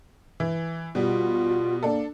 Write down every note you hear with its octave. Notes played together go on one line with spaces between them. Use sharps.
E3
B2 G3 F4
A#3 D4 A4